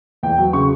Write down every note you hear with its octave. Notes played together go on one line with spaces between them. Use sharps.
E2 G5
F#3
C#3 C#6